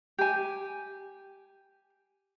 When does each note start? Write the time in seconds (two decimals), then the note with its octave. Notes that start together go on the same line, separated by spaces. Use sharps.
0.18 G4 G#5